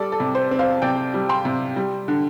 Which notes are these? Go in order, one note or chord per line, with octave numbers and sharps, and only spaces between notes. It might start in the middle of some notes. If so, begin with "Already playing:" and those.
Already playing: G3 A4 D5
A4
C3
C5
C4
C5 F5
C3 D5 G5
G3
G5 C6
C3
G3
D3